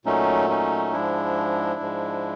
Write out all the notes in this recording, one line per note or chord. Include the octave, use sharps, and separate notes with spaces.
A#2 F#3 A3 C#4 D#4
C#4 D#4
G#2 F3 G#3 D4 E4
G#2 F3 G#3